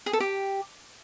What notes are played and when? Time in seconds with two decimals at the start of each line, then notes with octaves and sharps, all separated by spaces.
0.06 G#4
0.13 A4
0.20 G4